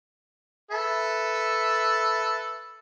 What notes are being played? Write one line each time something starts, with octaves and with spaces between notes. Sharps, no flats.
A4 B4 E5